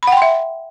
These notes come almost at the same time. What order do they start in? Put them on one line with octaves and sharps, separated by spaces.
B5 F#5 G5 C6 E5